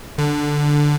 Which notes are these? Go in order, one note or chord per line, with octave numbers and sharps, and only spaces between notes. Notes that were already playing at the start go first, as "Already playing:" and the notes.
D3